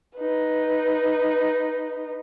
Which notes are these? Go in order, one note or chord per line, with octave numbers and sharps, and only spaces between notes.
D#4 B4